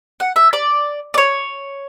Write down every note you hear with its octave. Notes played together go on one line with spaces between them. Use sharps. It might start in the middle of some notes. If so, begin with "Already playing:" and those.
F#5
E5
D5
D5
C#5